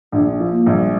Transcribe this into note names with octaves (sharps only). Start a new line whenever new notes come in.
A#1 D4
F3
A#3
A#1
G3